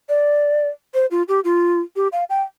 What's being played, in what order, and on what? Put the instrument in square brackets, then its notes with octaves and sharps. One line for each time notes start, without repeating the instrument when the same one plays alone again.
[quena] D5
C5
F4
G4
F4
G4
F5
G5